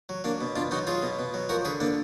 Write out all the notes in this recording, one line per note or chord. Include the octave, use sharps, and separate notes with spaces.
F#3
F#3 A#3 D4
B2
B2 D4 F4
F#3 D#4 F#4
F#3 F4 G#4
B2
B2
F#3
F3 F#4 A#4
D3 G#4 B4
D3 A#3 D4